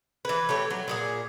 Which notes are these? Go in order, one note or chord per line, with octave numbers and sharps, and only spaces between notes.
E3 B4
A3 G4 C#5
F#3
A#2 G4 G#4